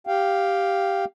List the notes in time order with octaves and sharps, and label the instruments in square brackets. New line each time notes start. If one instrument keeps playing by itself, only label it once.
[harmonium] G4 F5 G5